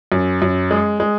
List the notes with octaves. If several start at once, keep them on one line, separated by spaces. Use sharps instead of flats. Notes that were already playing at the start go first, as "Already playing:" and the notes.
F#2
F#2
G#3
G#3